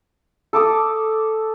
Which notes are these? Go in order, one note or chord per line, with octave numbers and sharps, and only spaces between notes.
A4 D6 D#6